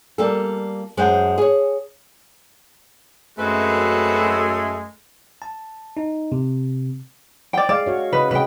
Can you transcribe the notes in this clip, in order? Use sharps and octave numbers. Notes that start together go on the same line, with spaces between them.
G3 A#3 F4 A4
F#2 G#3 C5 F#5 G5 A5
G#4 C#5
F#2 G#3 A3 C4 F#4 B4
A5
D#4
C3
D5 G5
G#3 D5 F5
F#4 C#5
C#3 B4 D#5
C3 G#3 B4 G5